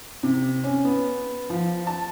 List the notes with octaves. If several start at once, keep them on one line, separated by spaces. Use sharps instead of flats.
C3
C#4
B3
F3
A5